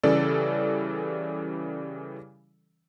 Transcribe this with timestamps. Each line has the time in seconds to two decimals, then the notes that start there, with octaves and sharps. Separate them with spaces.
0.03 C#3 E3 G3 C#4 A4 D5